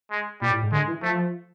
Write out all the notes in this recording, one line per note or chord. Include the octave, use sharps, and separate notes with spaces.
G#3
A#2 G3
A2
G#2
D3 G#3
E3
F3 A3